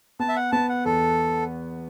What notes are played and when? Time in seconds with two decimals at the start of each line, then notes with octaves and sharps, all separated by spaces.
0.20 B3 A5
0.29 E5
0.36 F#5
0.52 B3 A5
0.69 F#5
0.85 E2 A4